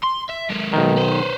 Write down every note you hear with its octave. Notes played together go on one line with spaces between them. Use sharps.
C6
E5
G#3 A#3
B1 D#3
B4 C5